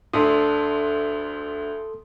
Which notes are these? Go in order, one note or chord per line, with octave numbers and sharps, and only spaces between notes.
D2 D4 A4 C6 D#6